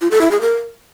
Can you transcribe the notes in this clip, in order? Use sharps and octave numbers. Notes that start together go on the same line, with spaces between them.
F4
A4
E4
G#4
A#4